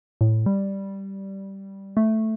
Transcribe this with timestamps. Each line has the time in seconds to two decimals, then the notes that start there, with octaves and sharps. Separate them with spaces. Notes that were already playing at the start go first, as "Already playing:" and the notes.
0.21 A2
0.46 G3
1.97 A3